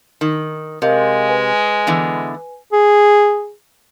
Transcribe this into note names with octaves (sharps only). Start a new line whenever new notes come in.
D#3
C3 G#3 A#4 D#5 F5
B4 G#5
D3 E3 B3
G#4